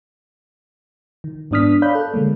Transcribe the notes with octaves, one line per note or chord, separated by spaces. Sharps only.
D#3
G#2 B3 D4 D#6 F6 B6
C#5 D5 F5 B5 F#6 G6
A4
D3 G#3 A#3